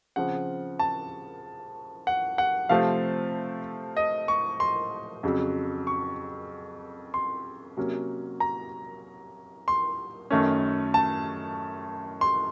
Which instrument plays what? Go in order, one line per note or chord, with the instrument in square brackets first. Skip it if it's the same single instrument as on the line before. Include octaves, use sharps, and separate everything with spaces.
[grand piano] C#3 F3 C4 F#5
A5
F#5
F#5
C3 F3 A3 C4 F5
D#5
C#6
C6
F2 C#3 F#3
C#6
C6
C3 F#3 A#3 C#4
A#5
C6
F#2 D#3 A3 C#4
A5
C6